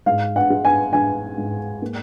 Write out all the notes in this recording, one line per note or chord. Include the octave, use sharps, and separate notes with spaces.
G#2 F5
F#5
G#3
G#5
G#3 G#5
G#2
A#3